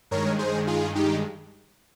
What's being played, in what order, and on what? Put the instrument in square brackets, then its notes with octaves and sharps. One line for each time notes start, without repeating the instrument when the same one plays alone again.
[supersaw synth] G2 D#3 G#3 A#4 C#5
G#4 C5
F4 G#4
D#4 G4